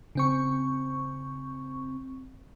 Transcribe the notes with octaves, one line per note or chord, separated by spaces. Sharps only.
C#3 C4 C#6